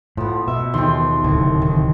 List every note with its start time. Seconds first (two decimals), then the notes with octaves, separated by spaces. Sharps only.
0.17 A2 F3 B3
0.48 B2 E5
0.74 D#2 C4 C6
1.24 D1 C2
1.62 D#3